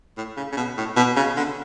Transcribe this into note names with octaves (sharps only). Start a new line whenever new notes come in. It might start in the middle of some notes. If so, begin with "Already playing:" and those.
A2
C#3
C#3
B2
A2
B2
C#3
D3